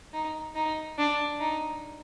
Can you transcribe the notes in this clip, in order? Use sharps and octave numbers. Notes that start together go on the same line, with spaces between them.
D#4
D#4
D4
D#4